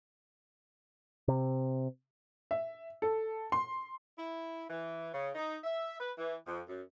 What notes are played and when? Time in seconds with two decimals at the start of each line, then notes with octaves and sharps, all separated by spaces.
1.28 C3
2.51 E5
3.02 A4
3.52 C6
4.18 E4
4.69 E3
5.12 C#3
5.35 D#4
5.64 E5
6.00 B4
6.18 E3
6.47 F2
6.69 F#2